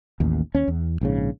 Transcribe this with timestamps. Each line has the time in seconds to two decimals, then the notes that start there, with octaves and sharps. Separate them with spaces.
0.20 A1 D#2
0.54 D#2 C#4
0.68 E2
1.01 A#1 G#2 C#3